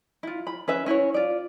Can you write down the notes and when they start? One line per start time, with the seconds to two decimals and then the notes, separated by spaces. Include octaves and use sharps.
0.23 E4 F4
0.47 B5
0.68 C#4 B4 E5
0.86 C#4 E4 F#4 C#5
1.14 F4 D5